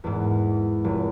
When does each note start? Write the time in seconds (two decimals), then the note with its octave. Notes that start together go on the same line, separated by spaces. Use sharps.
0.04 E2 G#2
0.84 F1